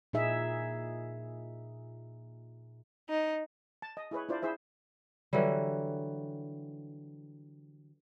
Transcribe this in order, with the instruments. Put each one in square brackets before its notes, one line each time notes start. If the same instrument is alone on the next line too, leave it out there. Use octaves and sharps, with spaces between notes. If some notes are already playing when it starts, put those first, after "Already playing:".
[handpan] A#2 D#4 G#4 E5
[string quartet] D#4
[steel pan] A5
D#5
E4 G#4 B4 C#5
D4 E4 F4 C5 D5
E4 G#4 C5 E5
[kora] D3 E3 F#3 G3